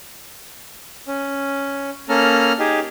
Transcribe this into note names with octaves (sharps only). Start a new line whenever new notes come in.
C#4
A#3 C#4 A4 A#5 F6
D#4 G4 G#4